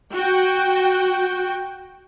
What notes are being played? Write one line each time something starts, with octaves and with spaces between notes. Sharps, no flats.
F#4 G5